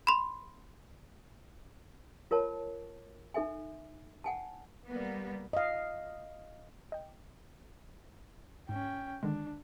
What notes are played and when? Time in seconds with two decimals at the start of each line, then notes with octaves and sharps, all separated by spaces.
0.07 B5 C6
2.31 F4 A#4 C#5 A5
3.34 D#4 A4 E5 G#5
4.24 F#5 G#5 A5
4.87 G3 A#3 B3
5.53 D#5 F5
6.92 D#5 G5
8.69 G#2 C#4 G5
9.23 D3 D#3 G#3 D4